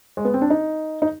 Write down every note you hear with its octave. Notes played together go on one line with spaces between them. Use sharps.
G#3
B3
C4
D4
D#4
D#4